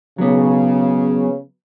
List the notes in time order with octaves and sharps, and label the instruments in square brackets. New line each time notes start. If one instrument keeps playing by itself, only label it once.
[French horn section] C#3 [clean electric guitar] F#3 B3